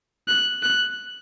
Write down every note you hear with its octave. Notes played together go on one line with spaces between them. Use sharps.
F#6
F#6